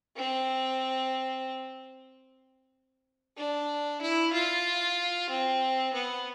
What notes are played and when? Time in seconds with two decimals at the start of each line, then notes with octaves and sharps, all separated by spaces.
0.17 C4
3.37 D4
4.02 E4
4.33 F4
5.30 C4
5.94 B3